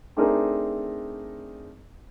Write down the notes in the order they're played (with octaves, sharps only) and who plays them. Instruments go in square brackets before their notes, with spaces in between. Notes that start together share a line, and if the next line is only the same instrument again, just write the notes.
[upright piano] A3 C4 D4 D#4 G#4 A#4